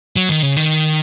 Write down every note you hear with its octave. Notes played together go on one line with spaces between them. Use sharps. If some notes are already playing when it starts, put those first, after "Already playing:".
F#3
D#3
C#3
D#3